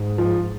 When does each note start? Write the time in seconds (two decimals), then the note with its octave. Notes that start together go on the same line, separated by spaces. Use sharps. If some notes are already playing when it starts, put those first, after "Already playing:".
Already playing: G#2
0.18 F3